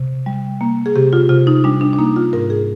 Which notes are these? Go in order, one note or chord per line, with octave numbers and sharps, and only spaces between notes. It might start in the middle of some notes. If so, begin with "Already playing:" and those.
Already playing: C3
G3
A#3
G#4
C3 G4
F4
C3 F4
D#4
G3 D4
D4
D4
A#3 D#4
F4
G#2 A#4
G#4